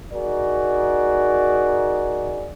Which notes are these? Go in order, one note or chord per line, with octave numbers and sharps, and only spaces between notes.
D#4 F#4 G#4 A#4 D5